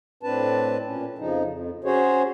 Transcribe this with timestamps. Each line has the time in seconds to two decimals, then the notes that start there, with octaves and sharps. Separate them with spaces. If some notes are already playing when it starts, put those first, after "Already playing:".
0.23 A2 C4 D4 B4 A5
0.85 A#2 C#4
1.18 F2 C#3 F3 D#4
1.46 F2
1.84 C#4 F#4 G#4 C5 C#5